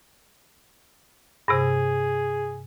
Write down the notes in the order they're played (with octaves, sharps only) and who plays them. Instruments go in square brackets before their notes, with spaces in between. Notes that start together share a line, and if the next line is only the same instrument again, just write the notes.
[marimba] G2 C3 [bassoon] G#4